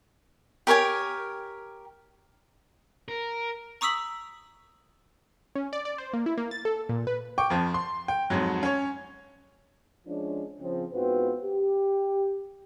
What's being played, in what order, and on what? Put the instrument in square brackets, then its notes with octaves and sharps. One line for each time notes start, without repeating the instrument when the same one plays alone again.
[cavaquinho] G4 A#4 C#5 G#5
[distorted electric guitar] A#4
[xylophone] A#5 C#6 D#6 E6 B6 F#7
[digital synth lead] C#4
D5
D5
C5
A#3
E4
A#3
A6
A4
A#2
B4
[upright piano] G5 C#6 D6
F2 F3
C6
G5
F2 G#2 F#3
C#4 C#5
[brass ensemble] F3 G#3 C#4 D4
C#3 F3 C4
G#2 B3 C4 F4 F#4 B4
G4